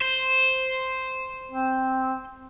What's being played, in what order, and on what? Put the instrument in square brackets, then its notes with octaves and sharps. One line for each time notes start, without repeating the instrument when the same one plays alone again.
[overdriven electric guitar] C5
[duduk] C4